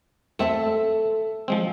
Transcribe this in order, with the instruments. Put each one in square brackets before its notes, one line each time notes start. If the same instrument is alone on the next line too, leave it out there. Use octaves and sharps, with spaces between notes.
[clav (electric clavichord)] A3 C4 [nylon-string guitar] A4 E5 A5
[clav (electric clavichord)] F3 G#3 C4